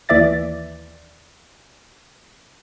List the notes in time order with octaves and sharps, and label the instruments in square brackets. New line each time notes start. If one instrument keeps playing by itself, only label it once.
[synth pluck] D#2 E3 D5 E5 A6